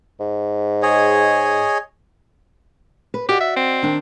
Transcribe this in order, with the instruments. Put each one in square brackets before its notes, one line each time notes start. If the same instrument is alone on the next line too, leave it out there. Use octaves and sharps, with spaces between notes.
[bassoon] G#2
[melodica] G#4 C#5 D#5
[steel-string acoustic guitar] B4
[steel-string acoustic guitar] F#4 D5 D#5 [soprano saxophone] G4
[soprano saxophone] E5
C4
[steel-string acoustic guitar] D#3 D4